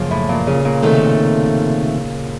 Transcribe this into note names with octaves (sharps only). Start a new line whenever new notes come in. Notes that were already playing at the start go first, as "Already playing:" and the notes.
Already playing: F#2 C#3 F3 A#3 F4
A2
A#2
C#3
A#2
C3 D#3 A3 D#4 A4